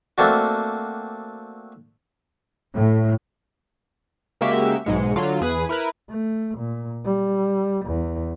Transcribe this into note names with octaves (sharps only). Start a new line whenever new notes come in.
A3 A#3 C4 D4 F#4
A2
C#3 G#3 A#3 F#4 G4 E5
B1 G#2 G#3 C#7
D3 F#3 F4
E2 G#4 B4 D#6
E4 A#4 B4
A3
A#2
G3
E2